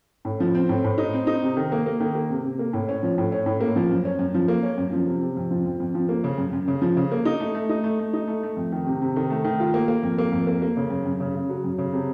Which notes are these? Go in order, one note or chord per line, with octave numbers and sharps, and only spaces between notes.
A2
F3
C4
A2
A2
D#4
C4
D#4
C3
D#3
A#3
A#3
D#3
A#3
C3
C3
A#3
A2
C#4
F3
A2
C#4
A2
A#3
F3
F#2
C#4
F#2
F3
A#3
C#4
F#2
F3
C3
C3
F2
F3
F2
F2
F3
A#3
C#3
F#2
F#2
C#3
F3
C#3
A#3
D#4
A3
A3
D#4
A3
A3
D#4
A3
A3
F2
D#3
C3
C3
D#3
A3
D#3
F4
A#3
A#3
F2
A#3
F2
A#3
A#3
C#3
F#2
F#2
C#3
C#3
F#3
F#2
C#3
C3